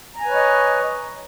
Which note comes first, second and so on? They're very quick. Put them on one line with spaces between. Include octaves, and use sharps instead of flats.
A#5 G#5 B4 C#5 D#5